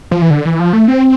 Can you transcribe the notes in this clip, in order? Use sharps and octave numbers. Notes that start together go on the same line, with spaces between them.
F3
E3
D3
E3
F3
A3
C4